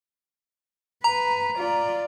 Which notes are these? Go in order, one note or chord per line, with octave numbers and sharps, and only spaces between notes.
B4 A#5
F4 D5